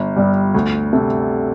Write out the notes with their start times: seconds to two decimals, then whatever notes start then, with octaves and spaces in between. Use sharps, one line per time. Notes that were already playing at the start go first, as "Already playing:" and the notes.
Already playing: G1
0.16 G2 G3
0.54 D2
0.93 C3 A3